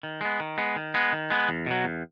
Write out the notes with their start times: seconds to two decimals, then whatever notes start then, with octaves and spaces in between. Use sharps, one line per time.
0.03 D#3
0.21 G#3 B3
0.40 D#3
0.58 G#3 B3
0.76 D#3
0.94 G#3 B3
1.13 D#3
1.30 G#3 B3
1.49 E2
1.66 B2 F#3
1.84 E2